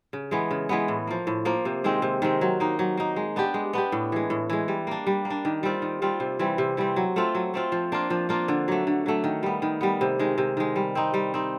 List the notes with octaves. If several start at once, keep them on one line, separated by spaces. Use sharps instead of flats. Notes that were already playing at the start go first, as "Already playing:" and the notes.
C#3
E3 G#3 B3
C#3
E3 G#3 B3
A2
F3 A#3
A2
F3 A#3
C3
D#3 G#3 C4
C3
D#3 G#3 C4
F#3
A#3 D#4
F#3
A#3 D#4
G#3
B3 D4 G4
G#3
B3 D4 G4
A2
E3 G#3
A2
E3 G#3
G3
A#3 D4
G3
A#3
D4
D#3
G3 C4 F4
D#3
G3 C4 F4
C3
E3 G3 C4
C3
E3 G3 C4
F#3
A3 C4 F4
F#3
A3 C4 F4
F3
A#3 D4 F4
F3
A#3 D4 F4
D3
F#3 A3
D3
F#3 A3
D#3
G3 B3
D#3
G3 B3
C3
D#3 G#3
C3
D#3 G#3
G3
C4 D#4
G3
C4 D#4